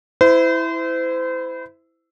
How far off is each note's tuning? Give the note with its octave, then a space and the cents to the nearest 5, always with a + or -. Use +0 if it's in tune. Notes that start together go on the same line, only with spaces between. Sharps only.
E4 +0 C5 -35